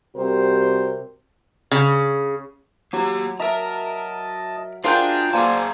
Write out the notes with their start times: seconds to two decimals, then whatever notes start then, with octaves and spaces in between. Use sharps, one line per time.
0.16 C3 G3 C4 F#4 A#4 C5
1.71 C#3
2.93 F#3 A#3 G4
3.40 A#4 D#5 E5 A5 A#5
4.84 D4 F4 G#4 A#4 C5 D5 F#5 G5
5.33 A#3 G#4 C5 D5 F#5 G#5 A5